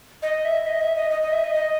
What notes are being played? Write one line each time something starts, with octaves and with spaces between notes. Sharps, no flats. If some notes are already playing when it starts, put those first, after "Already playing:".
D#5
E5
D#5
E5
D#5
D#5
D#5
E5
D#5
D#5